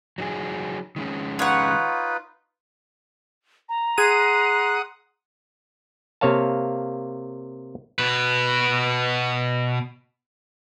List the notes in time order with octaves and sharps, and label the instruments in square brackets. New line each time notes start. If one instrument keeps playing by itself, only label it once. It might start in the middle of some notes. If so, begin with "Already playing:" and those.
[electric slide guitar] F#3 D#4 G#4
D#3 G#3 C#4
[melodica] D#4 F4 B4 [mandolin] C#5 F#5
[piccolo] A#5
[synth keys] G#4 D#7 [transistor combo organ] F#5 D#6 [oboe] C6
[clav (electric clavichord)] C3 A#3 C#5 F5 A5
[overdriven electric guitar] B2 B4